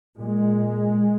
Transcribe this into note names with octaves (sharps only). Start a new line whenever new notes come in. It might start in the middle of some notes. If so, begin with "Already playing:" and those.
A#2 G#3